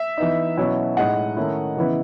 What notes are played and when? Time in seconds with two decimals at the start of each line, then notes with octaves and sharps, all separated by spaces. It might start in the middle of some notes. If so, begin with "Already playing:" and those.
Already playing: E5
0.17 E3 B3 D#4
0.57 B2 F#3 C#4 E4
0.97 A2 G#3 D#4 D#5 F#5
1.37 D#3 A3 C#4 E4
1.76 C#3 E3 B3 E4